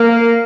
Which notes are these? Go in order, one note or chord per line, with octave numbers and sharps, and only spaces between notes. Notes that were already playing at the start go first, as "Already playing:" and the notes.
Already playing: A#3